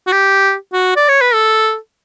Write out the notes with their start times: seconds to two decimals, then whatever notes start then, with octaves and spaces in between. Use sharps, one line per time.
0.07 F#4
0.12 G4
0.73 F#4
0.96 D5
1.09 C#5
1.21 B4
1.34 A4